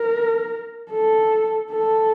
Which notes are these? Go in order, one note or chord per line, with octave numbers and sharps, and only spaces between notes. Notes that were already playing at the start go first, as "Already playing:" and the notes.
Already playing: A#4
A4
A4